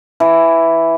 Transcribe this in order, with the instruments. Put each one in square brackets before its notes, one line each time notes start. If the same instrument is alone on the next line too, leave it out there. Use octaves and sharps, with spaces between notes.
[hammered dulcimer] E3